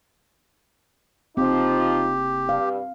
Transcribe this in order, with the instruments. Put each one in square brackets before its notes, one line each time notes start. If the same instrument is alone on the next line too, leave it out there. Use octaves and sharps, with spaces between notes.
[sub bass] F#1 [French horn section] F3 D#4 F4 [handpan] C4 [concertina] G4
[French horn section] G2 [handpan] F5